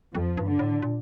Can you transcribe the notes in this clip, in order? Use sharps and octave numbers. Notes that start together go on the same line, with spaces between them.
F2 F3
G2
D3
A2
A#2